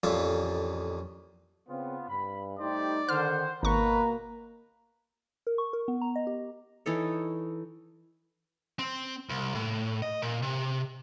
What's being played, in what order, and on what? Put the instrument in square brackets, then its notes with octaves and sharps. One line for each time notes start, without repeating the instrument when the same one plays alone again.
[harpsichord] A1 F2 A#2 F4 E5
[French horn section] C#3 C4 [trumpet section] B3 F4
[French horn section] G2 [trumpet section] B5
[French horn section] G3 A3 D#4 [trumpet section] G4 C5 [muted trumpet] D5
[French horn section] D3 D#3 [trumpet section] C5 F#5 [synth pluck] F6
[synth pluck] G#1 C#6 [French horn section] B2 A#3 [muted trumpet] B4 [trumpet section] A#5
[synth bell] A#4
C#6
A#4
B3
A#5
D#5
G4
[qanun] E3 D#4 A4 C#5
[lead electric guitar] C4
C2
A2
D#5
A#2
C3